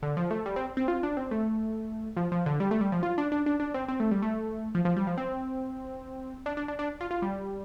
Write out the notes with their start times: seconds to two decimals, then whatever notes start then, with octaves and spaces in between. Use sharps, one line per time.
0.02 D3
0.17 F3
0.31 A3
0.46 G3
0.56 C4
0.77 C4
0.88 F4
1.03 D4
1.17 C4
1.31 A3
2.17 F3
2.32 F3
2.46 D3
2.60 G3
2.71 A3
2.81 G3
2.92 F3
3.03 F4
3.18 D4
3.32 D4
3.46 D4
3.60 D4
3.74 C4
3.88 C4
4.00 A3
4.11 G3
4.22 A3
4.75 F3
4.85 F3
4.96 G3
5.07 F3
5.18 C4
6.46 D4
6.57 D4
6.68 D4
6.79 D4
7.01 F4
7.11 F4
7.22 G3